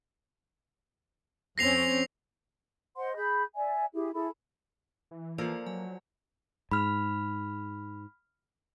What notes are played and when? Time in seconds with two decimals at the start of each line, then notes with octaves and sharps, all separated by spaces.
1.58 F2 C4 C#4 A#6 C7 F7
2.97 C5 D#5 F#5 C6
3.16 G#4 B5 G6
3.55 D5 E5 G#5
3.94 E4 G4 G#4
4.13 E4 G#4 A4 B5
5.11 E3
5.38 F3 A#3 F4 A4 A#4 D5
5.67 F#3 G#5
6.71 G#2 B5 F6